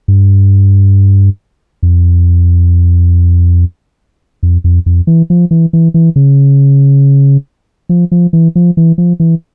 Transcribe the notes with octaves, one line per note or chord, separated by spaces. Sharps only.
G2
F2
F2
F2
F2
E3
F3
E3
E3
E3
C#3
F3
F3
E3
F3
E3
F3
E3